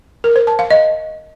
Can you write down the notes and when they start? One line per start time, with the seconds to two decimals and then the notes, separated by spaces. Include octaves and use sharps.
0.24 A#4
0.36 C5
0.47 A5
0.59 F5
0.71 D#5